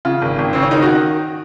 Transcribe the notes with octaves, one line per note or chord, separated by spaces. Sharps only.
C#3 F4
G#1
G#1
C#3 C4
C#4
D#3 D#4
F#4
D#3